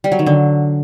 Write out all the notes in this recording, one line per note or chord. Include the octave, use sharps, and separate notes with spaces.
G3
F#3
D#3
D3